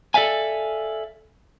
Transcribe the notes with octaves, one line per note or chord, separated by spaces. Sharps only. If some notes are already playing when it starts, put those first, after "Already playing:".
A4 D5 E5 F5 G#5